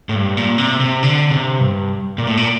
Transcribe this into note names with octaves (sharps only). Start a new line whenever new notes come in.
A2
G2
A#2
C3
C3
D3
C3
G2
A#2
A2
A#2